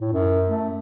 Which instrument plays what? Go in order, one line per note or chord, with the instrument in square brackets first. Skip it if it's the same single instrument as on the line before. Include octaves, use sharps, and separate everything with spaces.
[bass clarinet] A2
F#2
A3